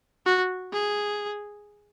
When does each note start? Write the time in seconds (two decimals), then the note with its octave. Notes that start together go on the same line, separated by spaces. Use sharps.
0.26 F#4
0.73 G#4